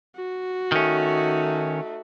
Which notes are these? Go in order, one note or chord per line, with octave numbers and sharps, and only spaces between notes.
F#4
D#3 A3 C#4 D#4